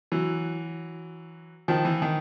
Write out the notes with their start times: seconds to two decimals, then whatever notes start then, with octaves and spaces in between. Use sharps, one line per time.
0.12 E3 F#3
1.68 D#3 F3
1.85 E3
2.02 D#3